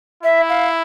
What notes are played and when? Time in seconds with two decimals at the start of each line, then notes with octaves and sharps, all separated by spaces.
0.23 E4 E5
0.49 F5